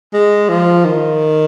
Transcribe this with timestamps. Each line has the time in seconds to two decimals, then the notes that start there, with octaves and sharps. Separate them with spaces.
0.14 G#3
0.49 F3
0.85 D#3